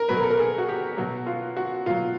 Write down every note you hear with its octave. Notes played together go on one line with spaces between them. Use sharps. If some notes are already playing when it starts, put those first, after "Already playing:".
Already playing: A#4
B2 F#3 B4
A#4
A4
A#4
G#4
F#4
G4
B2 F#3 F#4
F4
F#4
B2 F#3 F4